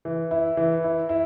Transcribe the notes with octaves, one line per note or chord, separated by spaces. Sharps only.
E3
E4
E3
E4
E4